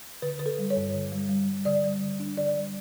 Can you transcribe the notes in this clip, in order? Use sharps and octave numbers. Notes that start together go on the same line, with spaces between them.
D3 B4
D3 B4
A4
G3
C#5
G2
D3
G3
G3
G3
D3 D5
G3
D3
D4
D3 D5
G3